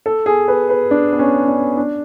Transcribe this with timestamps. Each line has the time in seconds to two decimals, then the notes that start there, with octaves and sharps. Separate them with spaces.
0.06 A4
0.26 G#4
0.48 B4
0.69 B4
0.91 D4
1.13 B3
1.19 C#4
1.48 D4
1.77 D4